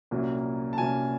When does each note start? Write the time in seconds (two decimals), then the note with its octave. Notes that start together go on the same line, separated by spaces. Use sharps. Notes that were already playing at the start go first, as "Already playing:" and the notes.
0.11 C2 A#2 F#3 A#3 C#4
0.73 A5
0.78 C2 A#2 F#3 A#3 C#4 G#5